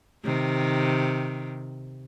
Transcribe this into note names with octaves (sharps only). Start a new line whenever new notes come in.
C3 D#3